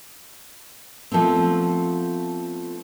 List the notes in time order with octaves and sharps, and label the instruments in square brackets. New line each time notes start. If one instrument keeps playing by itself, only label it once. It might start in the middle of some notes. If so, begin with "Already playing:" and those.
[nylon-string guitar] F3 A3 B3 C4